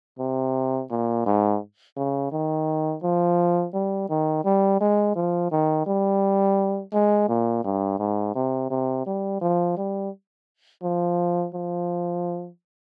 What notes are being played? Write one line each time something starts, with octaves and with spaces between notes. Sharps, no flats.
C3
A#2
G#2
C#3
D#3
F3
G3
D#3
G3
G#3
F3
D#3
G3
G#3
A#2
G2
G#2
C3
C3
G3
F3
G3
F3
F3